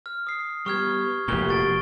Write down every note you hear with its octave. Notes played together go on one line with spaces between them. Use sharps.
F6
D#6 C7
G3 B3 C#6 F6 G#6
F1 A#2 A#3 F#4 G4 C#6 G7
C#6 A6 D7